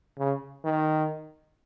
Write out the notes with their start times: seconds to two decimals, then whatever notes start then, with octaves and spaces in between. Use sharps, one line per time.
0.19 C#3
0.65 D#3